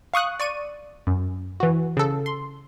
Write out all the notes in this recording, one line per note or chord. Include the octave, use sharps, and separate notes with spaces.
F5 C#6 D#6 F#6
D5 C#6 D#7
F#2
E3 F#4
C#3 A4
C6